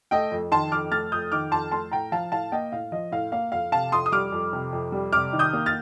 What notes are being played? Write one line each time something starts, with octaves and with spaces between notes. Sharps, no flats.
A3 D#5 G5
F2
D#3 A5 C6
F2 D6 F6
A3 F6 A6
F2 D#6 G6
D#3 D6 F6
F2 A5 C6
A3 A5 C6
A2 G5 A#5
F3 F5 A5
A2 F5 A5
A#3 D#5 G5
A2 F5
F3 D#5
A2 F5
A#3 F5
F2 F5
C3 F5 A5
F2 C6 D#6
D#6
G3 D6 F6
F2
C3
F2
G3
C3 D6 F6
D#3
D#6 G6
A#3
F6 A6